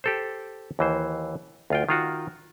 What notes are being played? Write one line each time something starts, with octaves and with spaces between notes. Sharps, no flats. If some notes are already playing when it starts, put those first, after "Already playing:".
G4 A4 C5
D#2 E3 C5
D2 F4 G5
D#3 F4 F#4